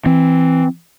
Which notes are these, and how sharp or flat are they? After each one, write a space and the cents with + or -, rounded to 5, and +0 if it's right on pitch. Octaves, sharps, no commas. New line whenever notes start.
E3 +0 C4 +0